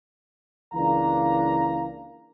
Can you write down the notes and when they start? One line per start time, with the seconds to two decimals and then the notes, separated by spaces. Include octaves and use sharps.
0.73 C#2 E3 A#3 D4 F5 A#5